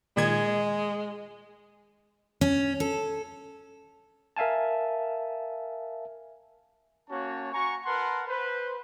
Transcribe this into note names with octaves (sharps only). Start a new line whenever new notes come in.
A#2 D#3 G#3 G#6
C#4
A4
A#4 E5 F5 G#5 A5
A#3 C#4 F#4 C#5 A5
F#4 G#5 A#5 C#6
A#4 B4 F#5 A5 C6
B4 C5